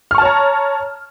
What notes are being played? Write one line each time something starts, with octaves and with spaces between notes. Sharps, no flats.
C#5 A5 A#5 C#6 F6